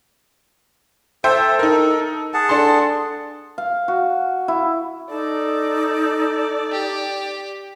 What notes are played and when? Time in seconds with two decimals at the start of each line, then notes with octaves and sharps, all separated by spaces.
1.24 A4 C5 E5 G5
1.59 D#4 A#4
2.34 G#4 F#5 A5
2.49 D4 A4 C6
3.58 F5
3.88 F#4
4.48 E4
5.11 D#4 A4 D5
6.72 G4